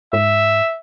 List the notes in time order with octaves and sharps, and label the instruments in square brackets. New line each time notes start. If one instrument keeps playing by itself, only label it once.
[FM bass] G#2 [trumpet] E5